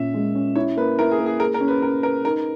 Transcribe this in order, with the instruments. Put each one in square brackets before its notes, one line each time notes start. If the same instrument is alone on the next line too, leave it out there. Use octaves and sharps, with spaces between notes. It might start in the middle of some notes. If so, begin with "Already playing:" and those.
Already playing: [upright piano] A#2 C#4 [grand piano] E5
[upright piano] G#3
C#4
[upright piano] E4 [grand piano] C#5
[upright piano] A#3 [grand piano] B4
[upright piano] E4 [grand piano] A#4
[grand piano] G#4
[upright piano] A#3
[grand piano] G#4
[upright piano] G#4 [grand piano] A#4
[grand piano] A#4
[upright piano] C#4
[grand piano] B4
[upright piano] C#4 [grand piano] A#4
[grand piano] A#4 [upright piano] B4
[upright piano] D#4 [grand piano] A#4